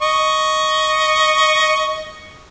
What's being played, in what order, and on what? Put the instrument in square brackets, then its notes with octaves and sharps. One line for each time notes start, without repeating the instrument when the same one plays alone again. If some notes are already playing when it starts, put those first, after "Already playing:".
[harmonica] D#5 C#6